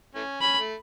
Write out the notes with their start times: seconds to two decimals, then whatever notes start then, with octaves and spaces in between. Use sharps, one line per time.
0.15 E3 A3 C#4
0.41 C#4 B5
0.59 A3